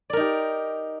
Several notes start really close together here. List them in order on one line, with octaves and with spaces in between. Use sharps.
D5 A#4 D#4 G4